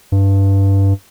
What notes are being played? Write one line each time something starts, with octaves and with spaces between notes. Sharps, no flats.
G2